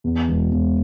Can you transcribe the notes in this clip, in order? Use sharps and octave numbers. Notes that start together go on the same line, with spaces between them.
E2
E1
E1